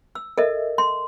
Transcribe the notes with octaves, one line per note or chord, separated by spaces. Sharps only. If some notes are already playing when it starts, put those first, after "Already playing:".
E6
A4 A#4 D#5 E5
C6